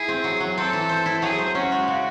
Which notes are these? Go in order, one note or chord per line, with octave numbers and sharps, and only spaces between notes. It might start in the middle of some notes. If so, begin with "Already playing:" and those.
Already playing: E4 G#4
C4
F#3
F#3
C4 A4
E3
C5
E4
F#3 G#4
C5
C#4 F#4
G#3
C#3